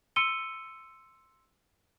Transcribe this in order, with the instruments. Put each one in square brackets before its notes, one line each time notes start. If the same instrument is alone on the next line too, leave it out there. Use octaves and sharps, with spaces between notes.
[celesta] C6 E6 C#7 D#7 G7